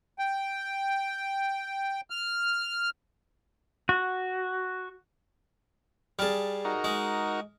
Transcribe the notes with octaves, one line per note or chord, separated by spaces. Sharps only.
G5
F6
F#4
G3 G#4 A5 F6
D#4 F#4 A#4
G#3